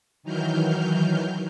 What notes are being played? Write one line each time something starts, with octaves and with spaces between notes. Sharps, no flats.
D#3 E3 F#3 F6 G6